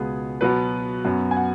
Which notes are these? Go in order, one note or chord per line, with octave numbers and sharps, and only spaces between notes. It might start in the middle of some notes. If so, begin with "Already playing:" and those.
Already playing: C#2 B2 G#3 B3 G#4
B2 F#3 B3 B4
F#2 F#3 B3
G#5
F#5